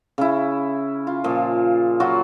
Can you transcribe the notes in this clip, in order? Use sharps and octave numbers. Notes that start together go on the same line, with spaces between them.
C#3 E4
F4
A#2 F3
F#3 F4 F#4